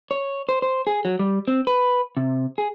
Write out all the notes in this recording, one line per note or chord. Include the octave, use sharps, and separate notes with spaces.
C#5
C5
C5
G#4
F#3
G3
C4
B4
C3
G#4